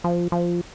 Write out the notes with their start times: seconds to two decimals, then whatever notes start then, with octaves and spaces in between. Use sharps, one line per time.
0.04 F3
0.32 F3